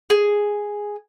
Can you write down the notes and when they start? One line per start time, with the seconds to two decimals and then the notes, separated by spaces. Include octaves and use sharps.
0.10 G#4